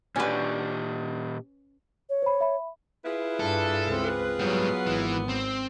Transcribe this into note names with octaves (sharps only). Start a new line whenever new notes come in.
A#2 C#4 D4 F#4 G4 B4
C#5
C5 B5
E5 B5
E4 F4 G#4 B4
G2 A4
C#2 C4
G#2 F#3 G3 B3
G#1 E3
C4